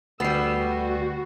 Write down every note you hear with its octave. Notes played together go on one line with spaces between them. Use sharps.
D2 G3 B3 E6 C7
F#4